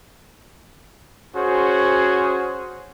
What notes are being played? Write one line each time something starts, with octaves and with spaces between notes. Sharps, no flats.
C#4 F#4 G#4 C5 C#5